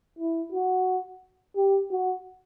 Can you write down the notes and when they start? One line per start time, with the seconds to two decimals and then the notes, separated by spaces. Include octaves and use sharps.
0.19 E4
0.52 F#4
1.56 G4
1.91 F#4